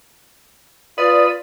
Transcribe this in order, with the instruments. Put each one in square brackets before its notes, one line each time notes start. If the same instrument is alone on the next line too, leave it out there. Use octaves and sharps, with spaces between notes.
[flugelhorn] F4 [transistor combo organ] B4 D#6 [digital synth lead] D5